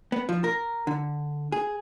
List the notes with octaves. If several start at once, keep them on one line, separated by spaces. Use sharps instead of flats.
B3
F3
A#4
D3
G#4